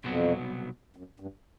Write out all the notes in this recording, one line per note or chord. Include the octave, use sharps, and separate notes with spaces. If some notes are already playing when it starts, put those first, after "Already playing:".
C2 F2 B2 F#3 B3
F#2
G2